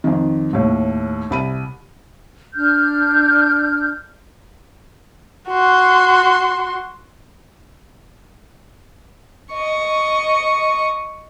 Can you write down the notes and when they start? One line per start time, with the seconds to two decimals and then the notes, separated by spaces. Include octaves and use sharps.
0.04 F2 D#3
0.53 D#2 A2
1.30 C2 B5 D#7
2.54 D4 F6 G6
5.49 F#4 C6
9.53 D#5 C#6